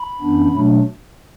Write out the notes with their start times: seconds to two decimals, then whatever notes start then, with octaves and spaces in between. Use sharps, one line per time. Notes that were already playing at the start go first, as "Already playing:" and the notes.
Already playing: B5
0.21 F#2 E3 B3 D4
0.52 B2 F#3 A3 D4